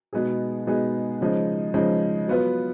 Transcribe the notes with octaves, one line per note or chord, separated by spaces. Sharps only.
B2 G#3 B3 D#4 G#4
B2 G#3 B3 D#4 G#4
C#3 F3 G#3 D#4
C#3 F3 G#3 D#4
F#3 B3 F4 B4